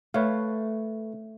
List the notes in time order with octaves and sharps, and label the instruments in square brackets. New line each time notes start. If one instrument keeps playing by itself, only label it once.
[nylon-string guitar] A3 [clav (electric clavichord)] B4 C#5 F5